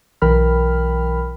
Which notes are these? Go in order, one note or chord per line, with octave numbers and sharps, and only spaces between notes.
B1 E3 A#4 G5 B5 F6